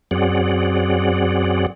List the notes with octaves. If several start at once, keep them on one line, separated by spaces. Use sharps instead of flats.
F#2 F#3 C4 G#4 D5 F#5